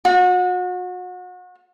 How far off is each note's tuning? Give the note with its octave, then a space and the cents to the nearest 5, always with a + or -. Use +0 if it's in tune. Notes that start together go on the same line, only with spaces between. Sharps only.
F#4 -35